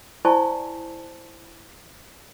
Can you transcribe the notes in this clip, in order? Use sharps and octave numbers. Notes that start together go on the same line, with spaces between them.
E4 C5 D5 G#5 A5 C#6